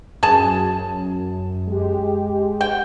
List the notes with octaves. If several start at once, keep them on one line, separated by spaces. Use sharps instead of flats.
F#2 G#4 A5
G#3 G4
F#5 G5